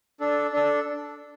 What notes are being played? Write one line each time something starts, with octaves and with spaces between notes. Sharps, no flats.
D4 A4
D4 A4